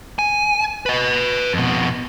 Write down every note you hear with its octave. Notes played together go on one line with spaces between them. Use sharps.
G#5
B4 D#5
F2 B2